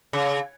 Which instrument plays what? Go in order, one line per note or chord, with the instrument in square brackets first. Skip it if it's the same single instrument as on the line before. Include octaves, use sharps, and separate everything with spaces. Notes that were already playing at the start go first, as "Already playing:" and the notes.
[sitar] C#3